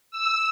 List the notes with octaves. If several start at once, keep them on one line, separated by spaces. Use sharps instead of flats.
E6